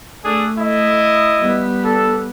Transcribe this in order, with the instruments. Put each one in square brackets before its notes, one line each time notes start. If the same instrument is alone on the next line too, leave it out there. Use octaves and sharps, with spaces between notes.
[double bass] A3 [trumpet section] D4 G#4 A4
[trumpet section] E4 D#5
[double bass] G3 B3
[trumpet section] D4 A4